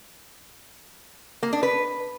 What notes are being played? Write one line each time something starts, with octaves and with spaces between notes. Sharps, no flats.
A#3
D4
B4